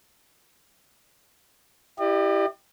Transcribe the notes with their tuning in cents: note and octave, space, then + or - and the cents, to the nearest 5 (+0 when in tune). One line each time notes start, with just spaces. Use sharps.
E4 +0 G4 +0 D5 +45